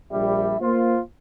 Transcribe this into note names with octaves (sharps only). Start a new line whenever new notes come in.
A#1 G3 E5
A#3 F4 C5